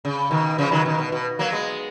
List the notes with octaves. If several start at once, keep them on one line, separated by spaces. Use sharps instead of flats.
C#3
B2 D#3
C#3 F3
D#3 F#3
B2 D#3
B2
B2
F#3 A#3
G#3 B3